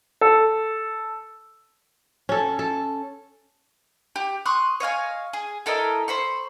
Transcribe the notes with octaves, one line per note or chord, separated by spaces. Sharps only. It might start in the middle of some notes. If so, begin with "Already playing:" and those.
A4
C#4 A4
A4
G4
C6 C#6 D#6 F#6
C#5 D#5 F5 G#5
G#4
E4 A4 A#4 D#5
C5 B5 C#6